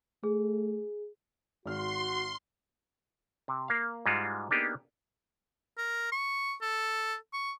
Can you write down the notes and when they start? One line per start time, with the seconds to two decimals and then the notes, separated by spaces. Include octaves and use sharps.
0.24 A3 G#4
1.66 G#1 F#4 C6 F6
3.48 C3
3.68 A#3 F5
4.06 G#2 G3 G#3 F4 F#4
4.51 A#3 B3 D4 D#4 G4 G#4
5.77 A#4
6.12 C#6
6.61 A4
7.33 C#6